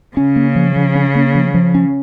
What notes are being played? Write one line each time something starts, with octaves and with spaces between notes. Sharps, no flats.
C#3 C#4
A#3
F3
F3
C#4
A#3
F3
F3
C#4